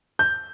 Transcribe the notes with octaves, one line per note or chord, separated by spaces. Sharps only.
G6